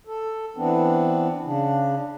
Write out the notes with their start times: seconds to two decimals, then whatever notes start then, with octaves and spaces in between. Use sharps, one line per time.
0.07 A4
0.57 E3 B3 C4 D4
1.44 C#3 D4